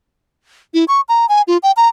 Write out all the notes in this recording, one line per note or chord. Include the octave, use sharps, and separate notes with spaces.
E4
C#6
A#5
G#5
F4
G5
A#5